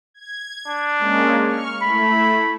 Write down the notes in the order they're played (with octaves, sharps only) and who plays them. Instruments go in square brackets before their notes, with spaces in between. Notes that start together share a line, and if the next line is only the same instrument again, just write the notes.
[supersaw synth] G#6
[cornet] D4
[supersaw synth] G#3 A#3 C#4
C#6 F6
[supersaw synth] A3 E4 [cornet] B5